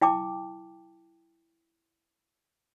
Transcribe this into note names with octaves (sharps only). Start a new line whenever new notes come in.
E4 G5 A5 D6